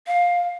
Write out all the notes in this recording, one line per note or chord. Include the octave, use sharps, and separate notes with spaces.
F5